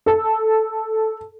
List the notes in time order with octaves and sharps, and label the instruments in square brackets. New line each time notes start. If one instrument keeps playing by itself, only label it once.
[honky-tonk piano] A4